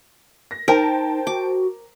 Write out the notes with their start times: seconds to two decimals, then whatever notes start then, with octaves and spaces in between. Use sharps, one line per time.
0.51 A#6
0.68 D#4 A#4 C5 G5 A5
1.27 F#4 D6